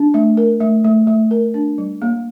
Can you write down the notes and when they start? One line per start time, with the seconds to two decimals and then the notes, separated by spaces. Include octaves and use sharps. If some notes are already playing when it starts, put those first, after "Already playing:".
Already playing: D4
0.14 A3
0.37 A#4
0.61 A3
0.84 A3
1.07 A3
1.31 A#4
1.54 D4
1.78 G3
2.02 A#3